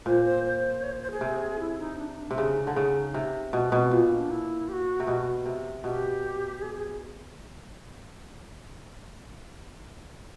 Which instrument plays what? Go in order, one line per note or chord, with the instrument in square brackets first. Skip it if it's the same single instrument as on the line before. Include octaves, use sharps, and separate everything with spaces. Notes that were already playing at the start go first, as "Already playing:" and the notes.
[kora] A#2 [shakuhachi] C5
[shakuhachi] C5
C5
C#5
C5
C5
G#4
[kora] C3
[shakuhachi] E4
D#4
D4
D#4
D4
[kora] C3 [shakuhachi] D#4
[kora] C#3 [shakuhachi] D4
[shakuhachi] D#4
[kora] D3 [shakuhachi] D4
[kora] C#3 [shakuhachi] D#4
[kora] C3 [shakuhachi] D#4
[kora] B2 [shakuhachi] C4
[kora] B2 [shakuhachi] C4
[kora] A#2 [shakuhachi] B3
[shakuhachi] D#4
D4
E4
G4
F#4
[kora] C3
B2
C3
[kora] B2 [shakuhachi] G4
[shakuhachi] G#4
G#4